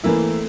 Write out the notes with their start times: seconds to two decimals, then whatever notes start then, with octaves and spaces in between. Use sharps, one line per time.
0.04 E3 A3 A#3 C4 E4